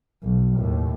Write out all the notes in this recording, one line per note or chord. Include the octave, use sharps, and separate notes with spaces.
B1
D#2 A2